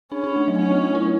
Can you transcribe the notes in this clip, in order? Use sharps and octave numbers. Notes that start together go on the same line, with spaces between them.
C#4 D4
D4
A3
F#3
A3 C#4
B3
E4